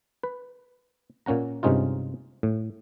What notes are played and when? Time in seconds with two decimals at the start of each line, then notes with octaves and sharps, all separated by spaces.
0.23 B4
1.26 A#2 A#3 C#4 F#5 A#5
1.63 G2 C3 G#3 C#4 D#4 F4
2.43 A2